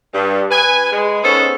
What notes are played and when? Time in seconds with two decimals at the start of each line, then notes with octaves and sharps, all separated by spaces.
0.14 G2
0.51 B4 G#5
0.92 G#3
1.23 B3 C#4 D#4 A4 C5 C#5